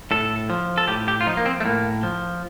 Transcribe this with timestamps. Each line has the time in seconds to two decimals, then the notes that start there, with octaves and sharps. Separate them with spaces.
0.11 A2 A4
0.50 F3
0.78 A4
0.88 A2 G4
1.08 G4
1.21 F4
1.26 F3 D#4
1.37 A#3
1.46 C4
1.60 A3
1.65 A2 A#3
2.03 F3